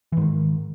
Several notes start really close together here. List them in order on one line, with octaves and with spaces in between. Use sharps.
E3 G#2 D#3